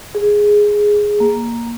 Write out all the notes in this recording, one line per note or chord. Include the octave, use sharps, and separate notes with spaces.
G#4
A#3